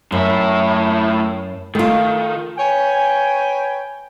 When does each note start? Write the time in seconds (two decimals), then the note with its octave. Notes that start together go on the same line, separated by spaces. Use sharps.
0.12 F#2 A2 E5
1.75 D#3 A3 F4
2.58 B4 C#5 G5 G#5